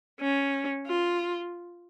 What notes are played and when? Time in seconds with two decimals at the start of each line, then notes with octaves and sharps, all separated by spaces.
0.20 C#4
0.87 F4